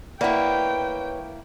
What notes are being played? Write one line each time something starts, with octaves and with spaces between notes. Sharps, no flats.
A#3 E4 B4 C#5 D5 F#5 G5